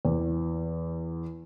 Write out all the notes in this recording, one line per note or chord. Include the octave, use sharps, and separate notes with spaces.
E2